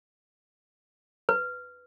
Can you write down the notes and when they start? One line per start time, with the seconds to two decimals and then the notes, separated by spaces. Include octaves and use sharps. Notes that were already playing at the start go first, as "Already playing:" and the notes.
1.29 B4